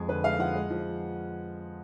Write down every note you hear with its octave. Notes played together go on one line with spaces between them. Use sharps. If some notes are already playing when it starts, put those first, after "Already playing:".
Already playing: F2 F3 G#3 G#4
D3 B4
G#3 F5
F3 F#5
G#3
F3